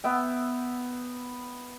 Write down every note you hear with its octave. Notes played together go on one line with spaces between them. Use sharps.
B3 E5 G5